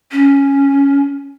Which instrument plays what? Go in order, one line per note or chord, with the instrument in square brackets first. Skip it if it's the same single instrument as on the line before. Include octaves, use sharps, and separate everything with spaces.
[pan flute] C#4